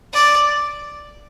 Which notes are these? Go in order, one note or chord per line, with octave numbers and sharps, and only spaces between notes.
D5